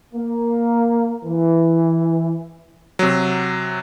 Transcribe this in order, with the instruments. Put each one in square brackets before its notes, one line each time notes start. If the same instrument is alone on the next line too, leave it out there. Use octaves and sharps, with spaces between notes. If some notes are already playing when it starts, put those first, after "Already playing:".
[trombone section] A#3
E3
[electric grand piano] C3 F#3